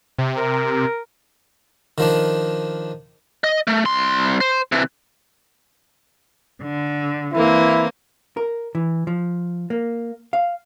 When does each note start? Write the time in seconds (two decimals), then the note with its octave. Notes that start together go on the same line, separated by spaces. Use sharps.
0.18 C3
0.37 A#4
1.98 D#3 F3 D4
3.44 D#5
3.67 A3
3.85 C2 C6
4.40 C5
4.72 C3 E3
6.62 D3
7.33 E3 A#3 C4 E4
8.37 A#4
8.75 E3
9.07 F3
9.70 A#3
10.33 F5